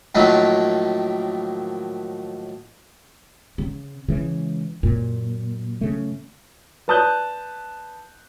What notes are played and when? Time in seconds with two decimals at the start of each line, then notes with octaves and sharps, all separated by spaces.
0.15 A2 D#3 F3 F#3 A3 A#3
3.58 C#3
4.08 C#3 E3 G#3
4.83 F#2 A#2
5.81 C#3 A3
6.88 B4 D5 A5 D#6 F#6 G6